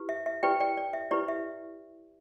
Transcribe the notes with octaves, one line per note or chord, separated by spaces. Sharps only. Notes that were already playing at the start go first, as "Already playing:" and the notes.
Already playing: E4 G4 B4
E5
E5
E4 G4 B4 D5 G5
D5 G5
D5
E5
E4 G4 B4 D5
E5